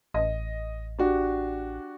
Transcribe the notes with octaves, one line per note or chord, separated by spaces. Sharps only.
A1 D#5
D4 F#4 G4